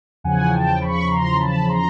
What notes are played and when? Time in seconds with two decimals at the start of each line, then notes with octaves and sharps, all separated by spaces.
0.24 E2 C#3 F3 F#5 G#5
0.52 G5 A5
0.82 B5 C#6
1.11 A#5 C6
1.40 A5 B5
1.69 A#5 C6